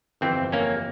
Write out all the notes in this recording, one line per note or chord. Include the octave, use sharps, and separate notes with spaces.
G1 F2 E3 C4
A#3 C#4